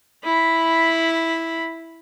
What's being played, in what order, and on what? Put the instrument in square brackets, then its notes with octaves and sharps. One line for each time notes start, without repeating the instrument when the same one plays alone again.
[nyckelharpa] E4 B5